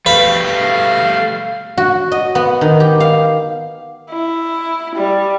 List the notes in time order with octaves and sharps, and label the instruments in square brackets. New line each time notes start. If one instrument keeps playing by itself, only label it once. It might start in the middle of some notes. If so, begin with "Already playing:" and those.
[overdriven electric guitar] G3 A3 [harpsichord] B4 [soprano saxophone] F5
[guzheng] F#4
D#5
B3
D#3
G4
F5
[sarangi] E4
G3